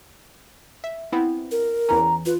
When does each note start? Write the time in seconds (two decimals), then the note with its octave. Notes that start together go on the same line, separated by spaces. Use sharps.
0.84 E5
1.12 B3 C4 E4
1.52 A#4
1.89 E2 E3 C#4 A#5
2.26 F4 B4